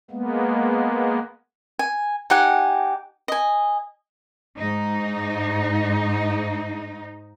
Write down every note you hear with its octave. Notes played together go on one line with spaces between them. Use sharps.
G#3 A#3 B3
G#5
D#4 G4 F#5 G#5
D#5 G#5
G#2 D#4